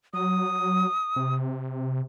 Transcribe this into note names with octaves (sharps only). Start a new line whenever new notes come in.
F#3 D#6
C3